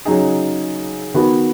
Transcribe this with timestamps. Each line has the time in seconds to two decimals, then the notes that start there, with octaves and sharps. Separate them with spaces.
0.05 C#3 F#3 D#4 G#4
1.14 D#3 B3 F#4 B4